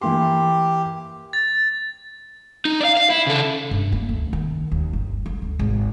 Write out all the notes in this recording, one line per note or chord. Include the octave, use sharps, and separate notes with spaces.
E3 A#3 G4 C6
A6
D#4
D5 F5
F5
E4
C#3 A4
G2
A#3
D2
D#3
D#2
G1
F2
D2
G#1